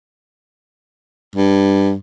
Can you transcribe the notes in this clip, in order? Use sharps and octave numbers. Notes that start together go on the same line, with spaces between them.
G2